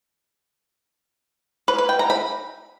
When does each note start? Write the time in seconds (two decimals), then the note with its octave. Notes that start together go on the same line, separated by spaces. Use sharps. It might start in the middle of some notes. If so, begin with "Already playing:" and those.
1.68 B4
1.78 B4
1.89 G5
1.99 A#5
2.10 B5